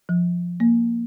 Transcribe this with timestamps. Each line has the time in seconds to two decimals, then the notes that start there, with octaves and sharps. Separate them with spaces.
0.09 F3
0.60 A#3